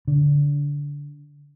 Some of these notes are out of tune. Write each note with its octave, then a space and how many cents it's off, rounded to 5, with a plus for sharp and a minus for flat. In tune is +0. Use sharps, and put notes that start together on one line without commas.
D3 -25